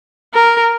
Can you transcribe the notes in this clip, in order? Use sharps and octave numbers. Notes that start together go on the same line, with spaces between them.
A#4